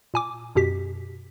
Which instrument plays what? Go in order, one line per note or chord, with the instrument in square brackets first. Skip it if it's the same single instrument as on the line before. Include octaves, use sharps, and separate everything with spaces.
[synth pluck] A#2 G#5 D6
F#2 B2 G4 B6